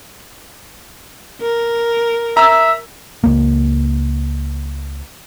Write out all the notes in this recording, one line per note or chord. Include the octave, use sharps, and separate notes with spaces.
A#4
E5 A#5 E6
C#2 A#3